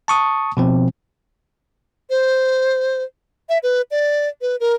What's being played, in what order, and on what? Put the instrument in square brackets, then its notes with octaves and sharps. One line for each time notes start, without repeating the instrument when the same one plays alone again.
[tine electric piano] A5 C#6 D#6
B2 F3 C4
[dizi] C5
E5
B4
D5
B4
A#4